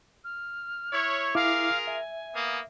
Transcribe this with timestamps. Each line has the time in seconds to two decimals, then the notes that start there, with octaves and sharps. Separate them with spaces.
0.24 F6
0.92 E4 C#5
1.35 E4 F4 G#4 A#4 F5 D6
1.87 E5 G#5
2.34 A#3 B3 D#6